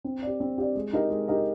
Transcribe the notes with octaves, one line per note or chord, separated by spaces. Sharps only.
C4
G4 D5
C4
G4 D5
G#3
D#4 G4 A#4 D#5
G#3
D#4 G4 A#4 D#5